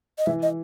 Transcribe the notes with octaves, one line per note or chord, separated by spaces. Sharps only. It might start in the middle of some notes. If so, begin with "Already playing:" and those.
D#5
E3 E5
D#5